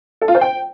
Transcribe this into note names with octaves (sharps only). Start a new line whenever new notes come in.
A4
F4
C5
G5